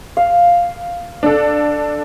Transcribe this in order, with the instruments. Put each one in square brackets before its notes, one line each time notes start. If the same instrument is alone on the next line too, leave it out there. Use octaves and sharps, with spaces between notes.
[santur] F5
[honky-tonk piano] D4 A4